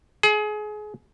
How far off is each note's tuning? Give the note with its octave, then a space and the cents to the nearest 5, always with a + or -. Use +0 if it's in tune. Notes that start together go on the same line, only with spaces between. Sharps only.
G#4 +30